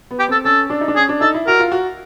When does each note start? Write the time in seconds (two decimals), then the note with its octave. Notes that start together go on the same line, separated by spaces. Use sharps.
0.11 B3
0.19 G4
0.28 C4 A4
0.45 C#4 A4
0.70 D4
0.81 D#4
0.88 D4
0.96 C#4 G#4
1.09 D4
1.21 D#4 A4
1.34 E4
1.47 F#4 A#4
1.60 F4
1.72 F#4